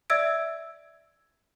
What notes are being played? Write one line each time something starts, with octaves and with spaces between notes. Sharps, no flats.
D5 E5 E6 G#6 D7